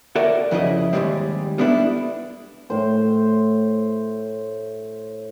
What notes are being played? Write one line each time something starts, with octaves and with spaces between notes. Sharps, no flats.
F#4 A4 A#4 C#5 D5 E5
F2 C#3 E4 G#4 D#5
D#2 G#2 F3 G3 G#3 C4
G3 B3 D4 E4 A4
A2 C5